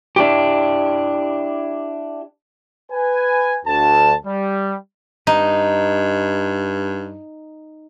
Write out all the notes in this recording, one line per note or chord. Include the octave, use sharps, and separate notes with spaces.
D4 E4 G4
B4 G#5
D2 A5
G3
G2 D#4